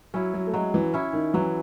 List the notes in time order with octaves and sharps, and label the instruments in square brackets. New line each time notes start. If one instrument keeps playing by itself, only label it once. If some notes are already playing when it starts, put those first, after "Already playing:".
[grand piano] F#3 [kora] C#4 E4
[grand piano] F#3
A3
[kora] F#3 [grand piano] G#3
[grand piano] E3
[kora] C#4 E4
[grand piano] D#3
[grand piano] E3 [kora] F#3